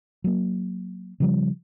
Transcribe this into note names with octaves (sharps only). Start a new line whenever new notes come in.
F#3 A#3
C#3 F3 G3